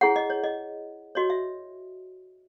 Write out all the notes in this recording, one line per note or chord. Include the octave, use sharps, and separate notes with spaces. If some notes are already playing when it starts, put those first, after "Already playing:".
E4 G#4 C#5 F#5
D#5
C#5
D#5
F#4 C#5 D#5
E5